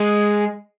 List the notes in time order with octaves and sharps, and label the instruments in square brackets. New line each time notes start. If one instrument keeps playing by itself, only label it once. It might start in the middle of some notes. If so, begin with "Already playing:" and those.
Already playing: [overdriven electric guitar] G#3